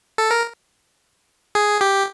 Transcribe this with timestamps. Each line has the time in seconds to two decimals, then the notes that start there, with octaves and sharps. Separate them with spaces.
0.18 A4
0.31 A#4
1.55 G#4
1.81 G4